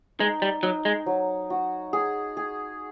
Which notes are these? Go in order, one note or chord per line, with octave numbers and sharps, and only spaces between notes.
G#3 D#4
G3
F#3 D#4
G#3
F#3
F#4
G#4
G#4